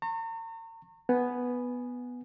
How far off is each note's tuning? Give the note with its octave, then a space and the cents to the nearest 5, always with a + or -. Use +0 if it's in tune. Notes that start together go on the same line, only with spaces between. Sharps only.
A#5 -40 C#6 -40
B3 +0 G#5 +0